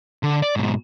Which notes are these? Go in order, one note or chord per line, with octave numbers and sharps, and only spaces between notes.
D3
D5
G#2 B2